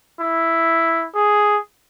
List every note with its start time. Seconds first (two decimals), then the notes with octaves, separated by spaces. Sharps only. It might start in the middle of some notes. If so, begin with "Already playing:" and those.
0.20 E4
1.14 G#4